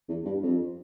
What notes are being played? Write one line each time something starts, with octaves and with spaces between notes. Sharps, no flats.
E2
G2
F2